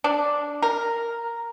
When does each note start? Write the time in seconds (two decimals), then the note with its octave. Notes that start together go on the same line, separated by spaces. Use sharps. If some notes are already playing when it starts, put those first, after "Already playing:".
0.04 D4
0.62 A#4